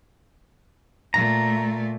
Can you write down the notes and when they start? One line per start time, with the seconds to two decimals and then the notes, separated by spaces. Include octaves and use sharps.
1.14 A#2 A3 A#5